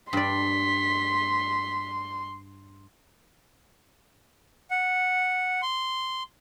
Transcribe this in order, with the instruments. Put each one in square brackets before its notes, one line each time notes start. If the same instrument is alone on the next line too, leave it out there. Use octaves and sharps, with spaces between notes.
[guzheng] G2 D5 [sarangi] C6 [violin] B6
[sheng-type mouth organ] F#5
C6